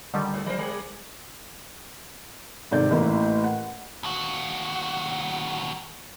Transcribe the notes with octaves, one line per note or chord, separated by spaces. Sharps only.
D3 D#3 G3
G#2 A4
F3 A#4 C5
G3
G#2 C3 D#3 A4 D5 G6
A1 A2 A#3 E4
F#5
D#2 F#4